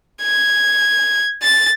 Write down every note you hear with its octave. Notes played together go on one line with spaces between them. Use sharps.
G#6
A6